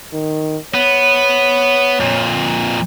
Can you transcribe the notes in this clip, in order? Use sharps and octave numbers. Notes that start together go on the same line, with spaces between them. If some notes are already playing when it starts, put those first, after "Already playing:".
D#3
B3 C#5
F2 A#2